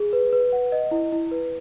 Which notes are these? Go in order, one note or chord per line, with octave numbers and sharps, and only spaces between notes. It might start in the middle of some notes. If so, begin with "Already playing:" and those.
Already playing: G#4
B4
B4
F#5
D#5
E4
E4
B4